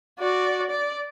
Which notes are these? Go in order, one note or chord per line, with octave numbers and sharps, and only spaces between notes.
F#4 D5
D5